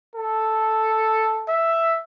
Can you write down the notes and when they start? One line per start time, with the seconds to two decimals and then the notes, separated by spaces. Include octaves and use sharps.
0.16 A4
1.49 E5